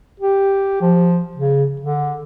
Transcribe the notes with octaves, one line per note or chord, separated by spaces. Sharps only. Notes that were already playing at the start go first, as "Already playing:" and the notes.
G4
F3
C#3
D3